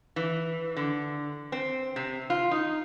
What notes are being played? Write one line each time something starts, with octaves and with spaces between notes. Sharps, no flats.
E3
D3
C4
C3
F4
D#4